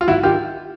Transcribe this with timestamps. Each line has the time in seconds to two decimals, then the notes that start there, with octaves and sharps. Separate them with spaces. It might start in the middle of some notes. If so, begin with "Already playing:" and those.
0.01 F4
0.08 G#1 E4 F#4
0.23 D#3 F4 G4